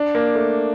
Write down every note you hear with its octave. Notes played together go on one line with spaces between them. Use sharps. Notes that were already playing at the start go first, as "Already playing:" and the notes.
Already playing: D4
A#3
A3